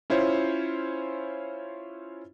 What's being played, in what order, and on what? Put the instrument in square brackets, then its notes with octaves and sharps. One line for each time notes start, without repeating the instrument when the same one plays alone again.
[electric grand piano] C#4 E4 F4 C5 C#5